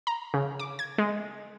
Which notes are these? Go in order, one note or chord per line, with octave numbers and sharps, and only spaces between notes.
A#5
C#3
D6
G#6
G#3